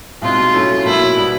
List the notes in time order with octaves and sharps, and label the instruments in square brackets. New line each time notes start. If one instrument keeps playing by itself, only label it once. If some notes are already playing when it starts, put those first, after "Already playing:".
[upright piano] C2 B2 G#3 C4 D#4 [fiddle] F4
[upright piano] A2 F#3 A3 C#4 E4
[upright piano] B1 B2 F#3 A#3 [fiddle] E4
[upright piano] B2 G3 B3